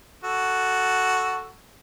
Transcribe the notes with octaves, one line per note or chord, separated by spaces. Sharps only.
F#4 A4